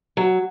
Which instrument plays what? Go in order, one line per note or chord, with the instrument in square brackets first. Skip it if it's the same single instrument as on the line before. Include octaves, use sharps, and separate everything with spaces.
[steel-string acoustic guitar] F#3